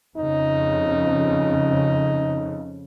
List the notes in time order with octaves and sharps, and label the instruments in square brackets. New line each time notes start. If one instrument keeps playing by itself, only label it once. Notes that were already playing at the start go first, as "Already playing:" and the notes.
[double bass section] F2 C#3 [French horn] D#4